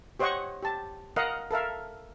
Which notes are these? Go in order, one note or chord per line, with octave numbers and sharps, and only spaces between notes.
G4 C5 C#5 D#5 F#5 C#6
G4 A5
A#4 D#5 F5 F#5
A4 A#4 E5 F5